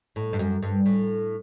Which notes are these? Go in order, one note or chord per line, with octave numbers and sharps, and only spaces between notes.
A2
G2
F#2
G2
A2